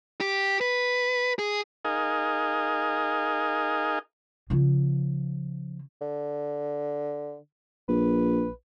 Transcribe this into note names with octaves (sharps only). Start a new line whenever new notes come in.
G4
B4
G#4
D#4 G#4 A#4 D#5 F5
C#3 F3
D3
A#1 B4